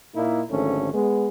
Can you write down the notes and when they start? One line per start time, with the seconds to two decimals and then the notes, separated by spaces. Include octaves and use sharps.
0.16 A#2 A#3 D#4 E4
0.51 G#1 D3 F3 A3 C#4
0.94 G#3 B3